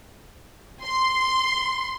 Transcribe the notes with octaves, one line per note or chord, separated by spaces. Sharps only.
C6